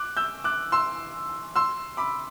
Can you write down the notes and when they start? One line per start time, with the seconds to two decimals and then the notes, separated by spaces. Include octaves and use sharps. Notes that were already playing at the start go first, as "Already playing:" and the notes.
Already playing: D6 F#6
0.17 E6 G6
0.44 D6 F#6
0.72 C6 E6
1.56 C6 E6
1.97 B5 D6